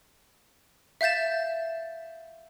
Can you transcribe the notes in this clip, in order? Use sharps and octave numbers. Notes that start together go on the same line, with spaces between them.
E5 F5 G6 A6 E7